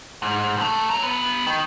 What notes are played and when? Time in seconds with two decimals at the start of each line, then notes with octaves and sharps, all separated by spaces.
0.22 G#2
0.57 C2 A3
0.90 C#5 A#5
1.03 G2 B3
1.47 D#3